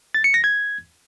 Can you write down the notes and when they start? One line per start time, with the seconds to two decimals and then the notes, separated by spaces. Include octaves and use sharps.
0.14 A6
0.24 C#7
0.34 A#6
0.44 G#6